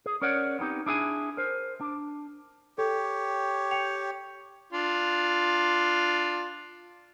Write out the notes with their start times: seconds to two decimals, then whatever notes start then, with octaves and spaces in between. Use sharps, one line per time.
0.06 G#4
0.22 C#4 A#4 C#5 D5 F#5
0.59 B3 C4 D#4 G4
0.86 D4 E4 G#4 G#5
1.37 A#4 C5
1.81 D4
2.78 G4 A4 C#5
3.71 G5 C#7 F7
4.73 D4 F4